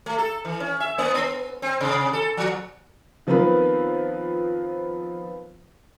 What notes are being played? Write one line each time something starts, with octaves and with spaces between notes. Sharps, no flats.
A3
A4
E3
C#4
E5
A#3
B3
C4
C3
A4
F3
D#3 F3 B3 C4 A#4 B4